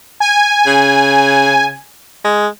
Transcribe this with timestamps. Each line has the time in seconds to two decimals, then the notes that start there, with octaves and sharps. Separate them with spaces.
0.20 G#5
0.66 C#3
2.24 G#3